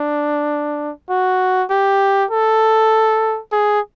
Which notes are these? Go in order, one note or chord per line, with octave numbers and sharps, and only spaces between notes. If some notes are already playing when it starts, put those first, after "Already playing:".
Already playing: D4
F#4
G4
A4
G#4